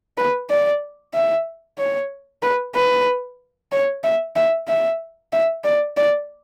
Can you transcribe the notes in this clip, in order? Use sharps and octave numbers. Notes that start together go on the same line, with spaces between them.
B4
D5
E5
C#5
B4
B4
C#5
E5
E5
E5
E5
D5
D5